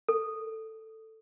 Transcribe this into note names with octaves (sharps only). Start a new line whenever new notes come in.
A4